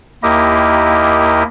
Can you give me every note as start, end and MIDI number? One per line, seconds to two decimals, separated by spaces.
0.23 1.43 39
0.23 1.43 58
0.23 1.43 64
0.23 1.43 67
0.23 1.43 75